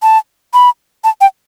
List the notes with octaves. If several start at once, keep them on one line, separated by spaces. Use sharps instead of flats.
A5
B5
A5
G5